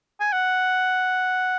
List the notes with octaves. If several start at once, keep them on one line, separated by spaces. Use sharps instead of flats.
G#5
F#5